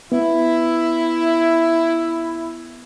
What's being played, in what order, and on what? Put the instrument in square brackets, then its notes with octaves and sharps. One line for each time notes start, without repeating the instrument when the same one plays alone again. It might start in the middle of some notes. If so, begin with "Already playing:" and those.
[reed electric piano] B3 [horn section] E4